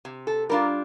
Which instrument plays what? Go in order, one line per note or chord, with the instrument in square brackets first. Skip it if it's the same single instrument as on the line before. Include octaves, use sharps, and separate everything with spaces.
[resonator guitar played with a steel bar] C3
A4
G3 D4 F4 A#4